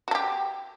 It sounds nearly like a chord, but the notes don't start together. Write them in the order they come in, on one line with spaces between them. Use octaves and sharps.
F#4 A4 G4